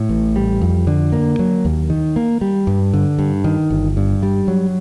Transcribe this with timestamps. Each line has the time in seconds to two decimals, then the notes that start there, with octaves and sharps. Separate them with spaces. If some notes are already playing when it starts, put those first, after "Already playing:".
Already playing: A2
0.09 A1
0.36 G3
0.62 F2
0.87 D3
1.12 A#3
1.39 F#3
1.65 D#2
1.90 D#3
2.16 A#3
2.41 G3
2.67 G2
2.93 D3
3.19 G2
3.44 D#3
3.70 G1
3.97 G2
4.23 G3
4.48 F#3